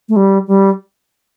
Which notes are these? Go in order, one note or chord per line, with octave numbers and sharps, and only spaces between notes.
A3
G3
G3